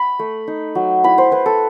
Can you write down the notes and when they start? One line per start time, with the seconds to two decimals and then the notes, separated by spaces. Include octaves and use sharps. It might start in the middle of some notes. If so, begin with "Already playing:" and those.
Already playing: B5
0.19 A3
0.47 D#4
0.75 F#3
1.04 E4 B5
1.18 C5
1.31 E4 B4
1.46 A4